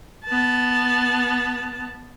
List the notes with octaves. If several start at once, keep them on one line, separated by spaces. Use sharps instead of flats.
B3 A5